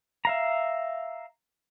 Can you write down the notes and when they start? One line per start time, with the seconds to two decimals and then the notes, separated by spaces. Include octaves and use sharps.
0.25 E5 F5 A#5